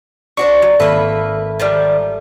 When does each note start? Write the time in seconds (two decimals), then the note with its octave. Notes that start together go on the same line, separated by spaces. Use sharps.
0.37 D4 F#4 C5 C#6
0.62 F#3
0.80 G#1 A#3 A4 B4 E5
1.60 D#3 F3 G3